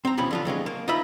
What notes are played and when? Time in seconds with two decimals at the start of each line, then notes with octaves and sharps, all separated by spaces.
0.05 C4 A#5
0.17 D#2 B2 F3 C#4 B5
0.31 D3 F3 F4
0.45 D#2 F#3 G#3 C#4
0.66 A#3
0.88 D#4 F4 E5 B5